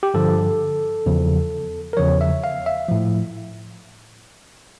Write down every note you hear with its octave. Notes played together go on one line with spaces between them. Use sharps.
G4
G2 D3 F3 A4
E2 C#3 F3
A#4
E2 C#3 F3 C#5
E5
F5
E5
A2 F3